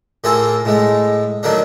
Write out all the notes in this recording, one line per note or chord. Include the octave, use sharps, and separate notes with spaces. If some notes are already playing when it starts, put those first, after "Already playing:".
A2 A#3 C4 F4 G#4 A4
A2 G#3 A3
D3 D#3 F#3 A3 A#3 D4